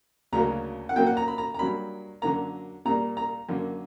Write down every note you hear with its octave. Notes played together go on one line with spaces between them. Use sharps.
D2 C#3 F#3 A#3 A#5
F#5
A#2 F#3 A#3 G5
F#5
A#5
B5
A#5
A#5
G2 F#3 A#3 B5
F#2 D3 F#3 A#3 A#5
A#2 G3 A#3 A#5
A#5
F#2 D3 A#3